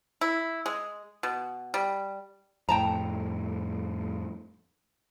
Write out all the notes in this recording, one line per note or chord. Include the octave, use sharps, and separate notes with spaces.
E4
G#3
B2
G3
F2 A2 G5 A5 A#5